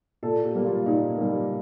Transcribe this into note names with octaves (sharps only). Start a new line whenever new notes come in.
A#2 A4
G4
G3 A#3
F4
A#2 D#4
G3 A#3